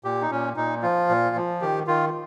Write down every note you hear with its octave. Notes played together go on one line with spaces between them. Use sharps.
A#2 G4
D#4
A#2 C#4
A#2 D#4
F3 F4
A#2
F3
D#3 G4
D#3 F4